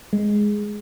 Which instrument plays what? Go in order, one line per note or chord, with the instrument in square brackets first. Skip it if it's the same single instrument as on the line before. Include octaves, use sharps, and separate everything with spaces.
[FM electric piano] G#3